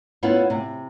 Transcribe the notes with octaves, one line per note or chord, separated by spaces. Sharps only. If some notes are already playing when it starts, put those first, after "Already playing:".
B3 C#4 E4 F4
C3